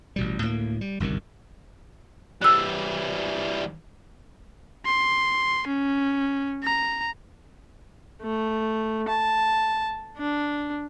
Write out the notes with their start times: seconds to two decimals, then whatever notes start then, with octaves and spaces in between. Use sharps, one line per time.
0.16 A1 B2 G3
0.41 D2 A2 F#3 A#3
0.81 G3
1.00 G1 C2 F#2 D#3
2.42 E3 G3 E6 F#6
4.86 C6
5.67 C#4
6.64 A#5
8.22 A3
9.08 A5
10.17 D4